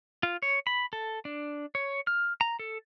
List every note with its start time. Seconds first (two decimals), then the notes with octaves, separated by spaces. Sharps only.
0.23 F4
0.42 C#5
0.67 B5
0.93 A4
1.25 D4
1.75 C#5
2.07 F6
2.41 A#5
2.59 A4